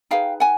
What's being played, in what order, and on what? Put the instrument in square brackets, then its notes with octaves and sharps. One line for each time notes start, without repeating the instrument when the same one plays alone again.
[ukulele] D#4 G#4 B4 F5 G5
F#5 G#5